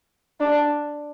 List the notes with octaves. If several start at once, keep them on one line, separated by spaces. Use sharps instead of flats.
D4